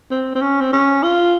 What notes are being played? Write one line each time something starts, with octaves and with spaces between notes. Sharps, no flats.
C4
C4
C#4
C4
C#4
F4